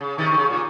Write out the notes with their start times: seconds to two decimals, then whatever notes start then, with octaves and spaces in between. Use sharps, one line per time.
0.01 C#3
0.18 C3 D#3
0.32 D#3
0.37 C#3
0.50 A#2